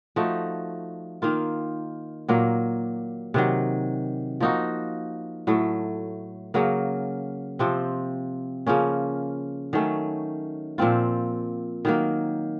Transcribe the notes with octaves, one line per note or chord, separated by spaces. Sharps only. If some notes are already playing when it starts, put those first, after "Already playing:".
F3 A3 D#4 F#4
D#3 A#3 F4
A#2 F#3 A#3
C3 D#3 F#3
F3 A#3 D#4 F#4
A2 F#3 A3
C#3 F#3 A#3
C3 F3 C4
C#3 F3 A#3 C#4
D#3 F#3 A3 C#4
A#2 F3 C4 F4
D#3 F#3 A#3